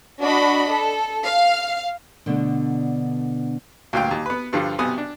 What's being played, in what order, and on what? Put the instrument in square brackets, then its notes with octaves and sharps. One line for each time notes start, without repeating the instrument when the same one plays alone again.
[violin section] D4 F#4 D#5 B5
A4
F5
[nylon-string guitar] B2 D3 A3 B3 C4 D4
[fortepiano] D2 G2 A#2 F5 G5
D#2
B3 B4
G2 D3 F3 G3
B1 C3 B3 G#5 D#6
D4